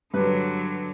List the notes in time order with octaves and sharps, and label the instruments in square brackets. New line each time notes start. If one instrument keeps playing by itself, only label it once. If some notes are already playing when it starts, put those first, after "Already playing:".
[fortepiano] G2 B4 [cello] D3 F#3